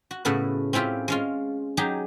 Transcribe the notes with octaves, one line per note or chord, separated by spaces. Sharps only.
F#4
A2 C#3 A3 B3 E4 F#4
C4 C#4 E4 F4 G4
G#3 C#4 F4
F#3 D#4 G4 G#4